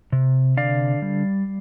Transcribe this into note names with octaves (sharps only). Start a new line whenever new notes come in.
C3
D3 D5 F5
G3